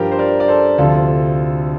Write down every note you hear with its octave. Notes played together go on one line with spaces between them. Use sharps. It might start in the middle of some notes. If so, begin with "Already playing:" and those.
Already playing: G2 F3 G4 A#4
C5
A#4 D5
D5
A4 C5
D2 C3 F3 F4 A4